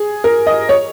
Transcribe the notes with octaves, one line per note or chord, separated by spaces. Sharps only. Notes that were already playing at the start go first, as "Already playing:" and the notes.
Already playing: G#4
A#4
D#5
C#5